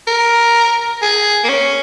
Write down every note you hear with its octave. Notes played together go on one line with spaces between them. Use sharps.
A#4
G#4
A#3
C#4